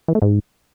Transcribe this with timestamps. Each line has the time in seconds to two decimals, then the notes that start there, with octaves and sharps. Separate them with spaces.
0.08 E3
0.15 A3
0.22 G#2